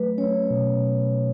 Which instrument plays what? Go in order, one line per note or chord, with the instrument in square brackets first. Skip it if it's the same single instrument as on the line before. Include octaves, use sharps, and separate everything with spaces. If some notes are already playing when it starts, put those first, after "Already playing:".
Already playing: [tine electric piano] F#3 A3 [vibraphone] B4
[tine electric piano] C#4 [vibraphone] C#5
[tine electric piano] B2